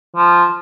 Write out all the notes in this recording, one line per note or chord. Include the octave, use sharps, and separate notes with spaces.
F3